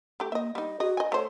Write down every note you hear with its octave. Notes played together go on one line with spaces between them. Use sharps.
A3 G4
A#3 D#5 E5
G3 D#4 D#5
F#4 G#4 D#5
D#5 G#5
A3 C5 C#5